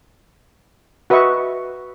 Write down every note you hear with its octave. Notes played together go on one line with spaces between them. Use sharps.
F#4 B4 D#5 E5 C#6